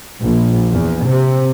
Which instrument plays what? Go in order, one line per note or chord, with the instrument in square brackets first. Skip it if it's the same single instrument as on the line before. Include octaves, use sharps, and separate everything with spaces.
[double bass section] A#1
E2
C3